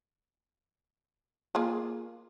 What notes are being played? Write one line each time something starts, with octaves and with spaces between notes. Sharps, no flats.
A#3 F4 G#4